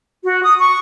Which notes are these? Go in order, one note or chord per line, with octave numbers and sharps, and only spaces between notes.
F#4
D#6
C#6